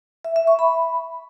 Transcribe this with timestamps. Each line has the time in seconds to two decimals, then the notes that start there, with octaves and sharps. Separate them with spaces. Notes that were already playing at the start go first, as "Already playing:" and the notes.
0.25 E5
0.36 E5
0.47 C#6
0.59 B5